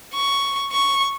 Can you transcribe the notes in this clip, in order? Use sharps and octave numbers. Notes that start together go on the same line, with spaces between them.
C#6
C#6